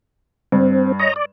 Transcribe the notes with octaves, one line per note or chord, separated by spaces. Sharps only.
G2 C4
C#5 D#5 A#5
D5